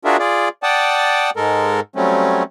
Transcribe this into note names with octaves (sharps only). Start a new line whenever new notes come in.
D4 F4 F#4 G#4 A#4 E5
F4 G#4 D5
D5 F#5 G5 A5 D#6
G#2 G#3 A4 A#4
F#3 G3 A3 C4 C#4